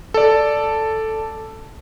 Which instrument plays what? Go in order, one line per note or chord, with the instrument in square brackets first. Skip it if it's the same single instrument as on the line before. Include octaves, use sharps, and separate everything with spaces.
[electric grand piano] A4 D5